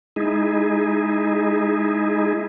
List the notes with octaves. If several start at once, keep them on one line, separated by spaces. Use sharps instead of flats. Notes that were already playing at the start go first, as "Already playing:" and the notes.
G#3 D#4 E4 G#4